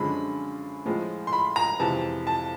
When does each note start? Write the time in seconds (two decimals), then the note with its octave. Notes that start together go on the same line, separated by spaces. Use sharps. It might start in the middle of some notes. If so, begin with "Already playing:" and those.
Already playing: F#2 D3 F3 G#3 B5
0.86 A2 F3 G#3
1.27 C6
1.33 B5
1.56 A#5
1.80 F2 C3 E3 G#3 A5
2.27 A5